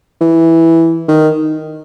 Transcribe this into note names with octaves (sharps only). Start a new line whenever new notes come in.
E3
D#3